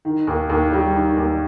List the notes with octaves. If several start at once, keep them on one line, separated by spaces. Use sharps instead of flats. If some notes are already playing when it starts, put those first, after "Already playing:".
D#3
D#2
D#2
G3
D#3
D#2